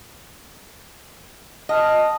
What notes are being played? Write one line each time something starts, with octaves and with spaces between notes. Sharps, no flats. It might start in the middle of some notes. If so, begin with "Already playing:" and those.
D#5 F#5 A5 F6